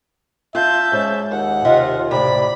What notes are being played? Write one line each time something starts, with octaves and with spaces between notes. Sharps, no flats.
F4 E5 F5 A5 G6
G#2 C#4
D#2 F#5
C3 F4 D#5 E5
A2 C3 D5 B5